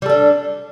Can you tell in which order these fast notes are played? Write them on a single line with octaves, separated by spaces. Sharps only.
G3 A4 D4